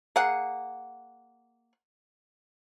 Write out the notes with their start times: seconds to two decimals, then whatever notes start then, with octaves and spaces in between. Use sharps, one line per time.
0.16 A#3 G#4 F#5